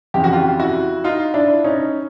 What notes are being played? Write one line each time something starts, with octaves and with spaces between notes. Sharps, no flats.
F2 C#3 E3 G4
F#4
F4 G4
E4 F#4
D#4 F4
D4 E4
C#4 D#4